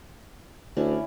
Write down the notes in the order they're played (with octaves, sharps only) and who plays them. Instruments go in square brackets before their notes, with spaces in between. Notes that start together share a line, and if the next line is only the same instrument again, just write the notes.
[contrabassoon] D2 [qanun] C#4 E4 D5